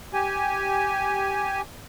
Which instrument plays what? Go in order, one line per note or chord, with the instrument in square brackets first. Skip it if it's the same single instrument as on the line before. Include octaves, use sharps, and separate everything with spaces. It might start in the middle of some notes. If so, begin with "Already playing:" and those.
[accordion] G4 G#5